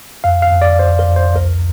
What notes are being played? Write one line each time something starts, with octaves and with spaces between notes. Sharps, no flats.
F2 F5
F5
F2
D5
F2 C5
A#4
F2
C5
C2 A#4